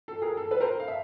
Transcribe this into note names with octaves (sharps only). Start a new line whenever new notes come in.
A4
G#4 A#4
A4
A4 B4
A#4 C5
F5
E5